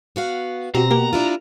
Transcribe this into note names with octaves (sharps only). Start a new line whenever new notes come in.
B3 F#4 F5
B2 C4 F#4 G4 A#5
A#3 F#4 G4 A#4
D4 E4 F4